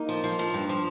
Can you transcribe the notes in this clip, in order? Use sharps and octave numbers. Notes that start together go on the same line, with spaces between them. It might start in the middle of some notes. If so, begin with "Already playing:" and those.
Already playing: A#3 D#4
F3
F3
F3
G2
F3